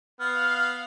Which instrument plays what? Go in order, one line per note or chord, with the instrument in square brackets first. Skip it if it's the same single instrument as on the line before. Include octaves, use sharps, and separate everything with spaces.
[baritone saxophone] B3 [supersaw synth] F5 [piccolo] F6